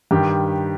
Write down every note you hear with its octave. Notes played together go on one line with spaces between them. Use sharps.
G2 D#3 G4